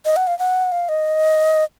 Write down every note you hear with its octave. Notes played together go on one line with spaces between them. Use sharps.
D#5
F#5
F5
F#5
F5
D#5